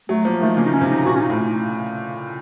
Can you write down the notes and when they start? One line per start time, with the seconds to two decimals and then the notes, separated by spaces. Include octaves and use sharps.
0.09 F#3 A3
0.25 F3 A#3
0.41 D#3 A3
0.57 C#3 A#3
0.65 D#4
0.73 C#4
0.81 C3
0.89 D#4
1.06 A#2 F#4
1.16 C#4
1.21 D#4
1.30 A2